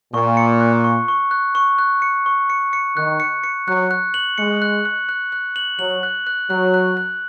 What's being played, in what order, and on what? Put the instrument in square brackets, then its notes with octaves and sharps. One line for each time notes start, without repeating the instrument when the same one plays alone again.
[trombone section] A#2 [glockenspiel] C#6
[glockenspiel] C#7
F#6
C#6
C#6
F#6
C#6
F#6
C#7
C#6
C#7
C#7
[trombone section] D#3 [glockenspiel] F#6
[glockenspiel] C#7
C#7
[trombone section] F#3 [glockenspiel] F#6
[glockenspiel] F#6
F#7
[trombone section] G#3 [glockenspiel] C#7
[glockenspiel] F#6
F#6
F#6
F#6
F#7
[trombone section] F#3 [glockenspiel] F#7
[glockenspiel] F#6
F#6
[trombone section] F#3 [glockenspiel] F#6
[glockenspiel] F#6
F#6